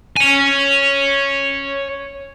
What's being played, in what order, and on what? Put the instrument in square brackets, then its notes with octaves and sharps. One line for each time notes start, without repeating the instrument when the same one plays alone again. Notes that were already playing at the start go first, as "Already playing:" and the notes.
[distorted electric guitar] C#5 G#5